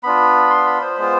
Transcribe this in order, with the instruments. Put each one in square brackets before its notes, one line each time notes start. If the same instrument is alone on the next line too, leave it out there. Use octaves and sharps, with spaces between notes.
[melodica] B3 D4 F4 B5
C6
B5
C5
G#3 B3 F4